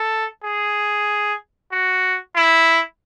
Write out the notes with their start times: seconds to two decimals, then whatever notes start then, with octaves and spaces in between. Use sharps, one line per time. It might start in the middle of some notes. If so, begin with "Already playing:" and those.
Already playing: A4
0.44 G#4
1.72 F#4
2.36 E4